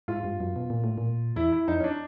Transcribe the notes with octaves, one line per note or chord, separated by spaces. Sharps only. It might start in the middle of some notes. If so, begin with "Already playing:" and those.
G#2 F4
G2
F#2
B2
A#2
A2
A#2
E2 E4
E4
F2 D#4
C#4
D4